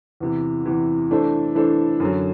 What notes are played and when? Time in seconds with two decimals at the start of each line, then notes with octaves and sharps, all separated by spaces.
0.20 E2 C3 E3
0.65 E2 C3 E3
1.11 E3 A3 D4 A4 C5
1.55 E3 A3 D4 A4 C5
2.00 F#2 D3 F#3